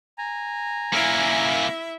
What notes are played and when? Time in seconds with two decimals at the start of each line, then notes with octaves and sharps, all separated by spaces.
0.18 G#5 A#5
0.93 A#3 C#4 E4 E5